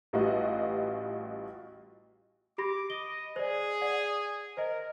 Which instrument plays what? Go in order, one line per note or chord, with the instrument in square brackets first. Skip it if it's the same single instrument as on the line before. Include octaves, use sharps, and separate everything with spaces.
[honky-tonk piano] A1 G3 F4 F#4 B4 D#5
[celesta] G4 B5 A#6 [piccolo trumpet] D6
[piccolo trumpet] D#5 [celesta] G7
[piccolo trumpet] G#4 [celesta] C5 D5
[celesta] D5 F#5
[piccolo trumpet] A#4 [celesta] C5 D#5